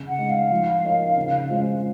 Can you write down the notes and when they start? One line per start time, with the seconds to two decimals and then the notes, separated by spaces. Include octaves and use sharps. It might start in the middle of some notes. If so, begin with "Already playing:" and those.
Already playing: C#3
0.08 F#5
0.18 G#3 D#4
0.30 F5
0.51 F3
0.84 A#3 D#4 A#4 C#5
1.17 C#3
1.49 G#3 C#4 F4 C5